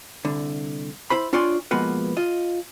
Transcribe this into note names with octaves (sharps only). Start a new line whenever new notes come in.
C2 D3
E4 C5 B5
D4 F4 C#5 D5 G#5 C6
B2 F3 G#3 A#3 B3 B4
F4 D#5